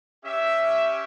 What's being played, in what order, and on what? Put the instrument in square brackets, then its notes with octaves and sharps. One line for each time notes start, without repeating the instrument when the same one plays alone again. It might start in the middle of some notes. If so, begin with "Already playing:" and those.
[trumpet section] C#4 G4 E5